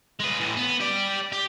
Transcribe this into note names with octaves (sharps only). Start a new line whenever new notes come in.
G#3 B4
A2 E3
B3
G4 D5
G4